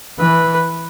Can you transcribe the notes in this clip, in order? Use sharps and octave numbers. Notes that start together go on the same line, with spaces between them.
E3 B4